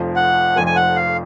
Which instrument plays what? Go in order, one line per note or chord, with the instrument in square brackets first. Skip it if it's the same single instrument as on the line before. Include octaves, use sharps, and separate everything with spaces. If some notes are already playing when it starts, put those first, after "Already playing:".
Already playing: [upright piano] F1 F2 F3
[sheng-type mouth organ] F#5
[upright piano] F1 F2 F3 [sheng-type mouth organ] G#5
[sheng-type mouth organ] G#5
F#5
F5